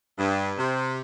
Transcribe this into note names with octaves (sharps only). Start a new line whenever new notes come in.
G2
C3